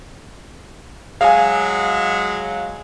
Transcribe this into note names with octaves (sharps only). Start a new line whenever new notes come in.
F#3 G#3 F5 G#5